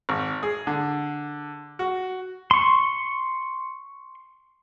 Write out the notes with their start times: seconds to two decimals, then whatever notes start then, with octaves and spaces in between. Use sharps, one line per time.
0.09 G#1
0.43 G#4
0.67 D3
1.79 F#4
2.51 C6 C#6